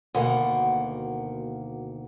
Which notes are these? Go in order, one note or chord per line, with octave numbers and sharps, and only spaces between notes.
D2 B2 D#3 A#3 F#5